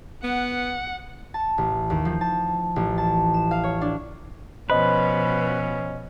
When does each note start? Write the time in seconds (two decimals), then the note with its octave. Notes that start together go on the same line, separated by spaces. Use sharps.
0.24 B3 F#5
1.34 A5
1.58 A1
1.90 D#2
2.05 F3
2.21 A5
2.76 A1
2.98 A5
3.34 E7
3.51 F5
3.64 C#5
3.81 D4
4.70 B2 F3 C#4 B4 C5 D#5